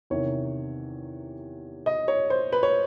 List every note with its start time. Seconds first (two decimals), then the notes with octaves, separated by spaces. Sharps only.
0.10 E2 C3 D#3 C#5
1.86 D#5
2.08 C#5
2.30 C5
2.52 B4
2.63 C#5